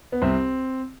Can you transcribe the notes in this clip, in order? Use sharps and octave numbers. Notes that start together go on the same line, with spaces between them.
B3
C2 C4